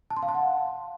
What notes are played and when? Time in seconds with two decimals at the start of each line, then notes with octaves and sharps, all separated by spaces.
0.10 A5
0.17 C6
0.23 F5
0.29 A5
0.35 F#5